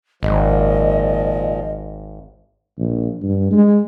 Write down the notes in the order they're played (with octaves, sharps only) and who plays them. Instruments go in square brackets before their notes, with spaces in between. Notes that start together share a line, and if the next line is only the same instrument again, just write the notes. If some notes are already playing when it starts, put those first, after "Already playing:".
[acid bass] G#1 [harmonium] A#2 F3 [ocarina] D#5
[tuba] A#1
G2
G#3